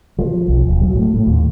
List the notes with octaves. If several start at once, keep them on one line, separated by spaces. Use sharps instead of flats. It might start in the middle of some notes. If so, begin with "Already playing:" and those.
F3
B1
D#1
F#3
A2
A2
D#2